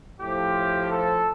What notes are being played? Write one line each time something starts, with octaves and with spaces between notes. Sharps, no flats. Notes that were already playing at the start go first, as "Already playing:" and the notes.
A2 F3 G4
A4